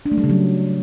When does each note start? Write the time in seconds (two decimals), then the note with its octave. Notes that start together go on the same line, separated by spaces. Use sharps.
0.06 D4
0.12 A3
0.18 G3
0.24 C#3
0.30 F#3